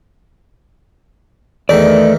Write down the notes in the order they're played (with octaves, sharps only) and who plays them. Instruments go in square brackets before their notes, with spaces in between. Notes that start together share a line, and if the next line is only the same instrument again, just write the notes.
[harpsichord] E2 D#3 [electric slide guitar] A3 D5